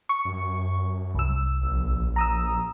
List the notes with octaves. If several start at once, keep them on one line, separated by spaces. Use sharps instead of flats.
C#6
F#2
C2 E6
A#1
A#5 D#6 E6